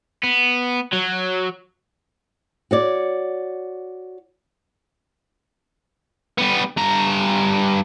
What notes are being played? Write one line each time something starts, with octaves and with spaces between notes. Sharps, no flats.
B3
F#3
F#4 C#5 D5
G3 B3
G2 A#5